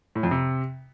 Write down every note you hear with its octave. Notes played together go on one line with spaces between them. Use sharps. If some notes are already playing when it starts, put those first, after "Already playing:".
A2
F2
C3